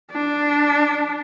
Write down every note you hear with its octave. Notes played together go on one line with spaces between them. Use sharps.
D4